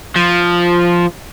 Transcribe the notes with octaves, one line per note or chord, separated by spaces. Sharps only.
F3